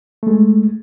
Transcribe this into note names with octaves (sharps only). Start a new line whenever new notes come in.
G#3 A3